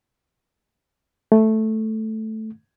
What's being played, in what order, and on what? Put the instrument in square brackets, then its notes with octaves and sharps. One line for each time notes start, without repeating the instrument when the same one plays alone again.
[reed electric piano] A3